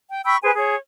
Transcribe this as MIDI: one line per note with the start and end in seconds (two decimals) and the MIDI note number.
0.11 0.20 79
0.25 0.36 79
0.25 0.36 83
0.25 0.36 85
0.25 0.36 88
0.42 0.52 68
0.42 0.52 71
0.42 0.52 72
0.42 0.52 80
0.56 0.76 68
0.56 0.76 73